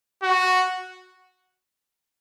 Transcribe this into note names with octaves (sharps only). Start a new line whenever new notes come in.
F#4